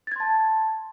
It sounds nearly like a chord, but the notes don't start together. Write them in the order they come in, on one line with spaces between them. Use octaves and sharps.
A6 G#6 C6 A5